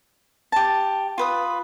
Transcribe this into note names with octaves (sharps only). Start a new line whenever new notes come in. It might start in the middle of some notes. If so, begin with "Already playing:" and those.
G4 A5
F4 B4 D#6